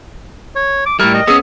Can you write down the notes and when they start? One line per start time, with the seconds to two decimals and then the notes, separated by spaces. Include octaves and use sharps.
0.56 C#5
0.86 D6
0.99 A2 G3 E4 A#4 D5 G5
1.14 D#5
1.27 B3 C#4 G#4 D#6 E6